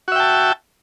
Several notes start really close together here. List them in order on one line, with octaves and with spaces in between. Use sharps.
F#4 E5 G5 A5